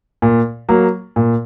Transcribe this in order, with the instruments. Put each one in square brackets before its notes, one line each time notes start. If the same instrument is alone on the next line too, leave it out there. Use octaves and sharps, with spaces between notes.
[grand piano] A#2
F#3 A#3
A#2